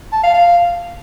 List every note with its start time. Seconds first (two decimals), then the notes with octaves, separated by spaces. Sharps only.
0.12 A5
0.23 F5
0.34 F5